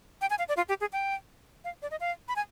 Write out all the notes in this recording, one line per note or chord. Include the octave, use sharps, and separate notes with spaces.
G5
G#5
F5
D5
F4
G4
G#4
G5
F5
D5
D#5
F5
B5
G#5